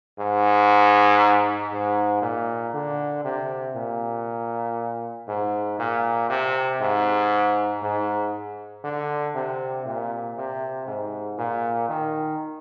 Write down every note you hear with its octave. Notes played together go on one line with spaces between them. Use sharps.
G#2
G#2
A#2
D3
C3
A#2
G#2
A#2
C3
G#2
G#2
D3
C3
A#2
C3
G#2
A#2
D#3